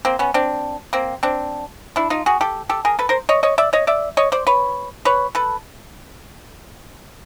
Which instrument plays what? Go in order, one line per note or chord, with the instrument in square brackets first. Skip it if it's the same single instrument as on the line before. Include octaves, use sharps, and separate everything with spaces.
[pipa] A#3 C4
B3 C#4
C4 D4
A#3 C4
C4 D4
D4 E4
D#4 F4
F#4 G#4
G4 A4
G4 A4
G#4 A#4
A4 B4
A#4 C5
C#5 D#5
C#5 D#5
D5 E5
C#5 D#5
D5 E5
C#5 D#5
C5 D5
B4 C#5
B4 C#5
A4 B4